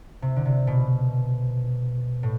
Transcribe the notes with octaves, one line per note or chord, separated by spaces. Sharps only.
C3
D3
C3
B2
A2